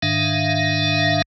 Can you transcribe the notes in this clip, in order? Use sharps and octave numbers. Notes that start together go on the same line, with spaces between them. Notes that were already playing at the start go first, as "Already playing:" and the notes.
G#2 D#3 D4 E5 F5